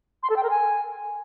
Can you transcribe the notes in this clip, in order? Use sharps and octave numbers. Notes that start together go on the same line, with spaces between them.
C6
A4
G5
A#4
G#5